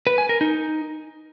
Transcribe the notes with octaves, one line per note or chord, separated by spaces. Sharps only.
B4
G#5
A#4
D#4